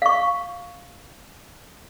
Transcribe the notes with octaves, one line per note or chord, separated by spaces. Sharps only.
F5 C#6